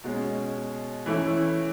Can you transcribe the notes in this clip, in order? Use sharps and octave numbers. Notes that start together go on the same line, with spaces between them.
B2 G#3 C#4
E3 A3 C#4 E4